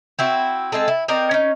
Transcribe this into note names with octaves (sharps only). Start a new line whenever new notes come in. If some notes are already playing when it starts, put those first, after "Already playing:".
C4 E4 F#4
G#3 C4 D#4 A4
E4
C4 A#4 D5 D#5
C#4 D#4